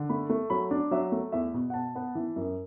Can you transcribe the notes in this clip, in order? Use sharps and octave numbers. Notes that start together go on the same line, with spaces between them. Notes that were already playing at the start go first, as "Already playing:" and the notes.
Already playing: D3
A3 B5
A3
F#3 B5
D4
F#3 E5
A3
E2 E5
B2
F#5
B2 A5
B3
E3
F#2